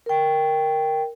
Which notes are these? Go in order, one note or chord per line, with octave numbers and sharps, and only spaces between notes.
A#4 G5